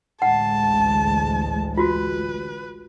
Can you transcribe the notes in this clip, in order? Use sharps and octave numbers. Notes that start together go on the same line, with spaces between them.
A1 D2 G#3 F#5 A5
F4 F#4 B4